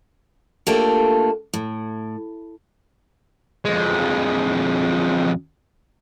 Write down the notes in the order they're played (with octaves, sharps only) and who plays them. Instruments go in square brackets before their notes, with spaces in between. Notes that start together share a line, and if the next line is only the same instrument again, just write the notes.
[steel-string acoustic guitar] A3 A#3 D4 F4 G4 A4
A2
[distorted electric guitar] F2 G#3